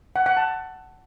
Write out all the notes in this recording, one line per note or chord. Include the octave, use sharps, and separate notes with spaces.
F#5
F#5
A5